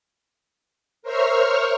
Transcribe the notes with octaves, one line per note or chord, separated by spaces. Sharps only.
A#4 C5 C#5 E5 C#6 F6